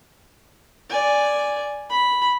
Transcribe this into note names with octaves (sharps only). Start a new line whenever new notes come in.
D5 G#5
B5